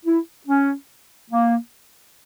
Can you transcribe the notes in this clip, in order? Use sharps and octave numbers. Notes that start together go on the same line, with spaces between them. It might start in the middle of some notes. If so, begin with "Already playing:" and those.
E4
C#4
A#3